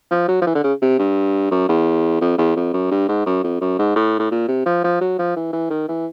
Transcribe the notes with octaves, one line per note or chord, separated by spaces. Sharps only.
F3
F#3
F3
E3
D3
C#3
C3
G2
F#2
E2
F2
E2
F2
F#2
G2
G#2
F#2
F2
F#2
G#2
A2
A2
A#2
C3
F3
F3
F#3
F3
E3
E3
D#3
E3